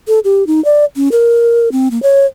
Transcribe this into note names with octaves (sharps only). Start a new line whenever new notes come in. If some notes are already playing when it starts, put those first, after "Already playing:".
A4
G4
D#4
D5
C#4
A#4
C4
A#3
C#5